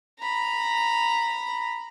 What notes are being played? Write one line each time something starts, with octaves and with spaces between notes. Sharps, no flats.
A#5 B5